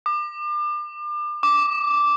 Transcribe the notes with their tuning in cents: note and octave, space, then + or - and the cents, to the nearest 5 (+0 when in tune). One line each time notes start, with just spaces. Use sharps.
D6 +35
D6 -10